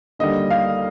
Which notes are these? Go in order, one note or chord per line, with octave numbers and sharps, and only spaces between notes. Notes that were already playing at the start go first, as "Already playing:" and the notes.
D#2 D3 G3 D#5
F5